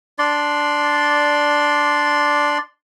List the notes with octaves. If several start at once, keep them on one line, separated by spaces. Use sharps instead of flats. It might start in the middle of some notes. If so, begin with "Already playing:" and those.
D4 D5 C6